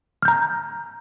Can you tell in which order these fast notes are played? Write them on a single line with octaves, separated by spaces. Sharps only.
F6 G6 A#5